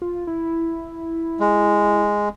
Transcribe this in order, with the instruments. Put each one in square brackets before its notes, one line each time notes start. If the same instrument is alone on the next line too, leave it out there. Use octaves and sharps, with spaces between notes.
[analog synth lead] F4
E4
[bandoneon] G#3